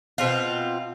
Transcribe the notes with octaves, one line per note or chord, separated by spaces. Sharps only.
B2 C4 F4